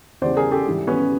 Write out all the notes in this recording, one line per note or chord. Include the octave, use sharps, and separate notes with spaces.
E2 C#3 E3 G3 C5 D5
G#4 A#4
G4 A4
G#2 E3 G3
B3 C#4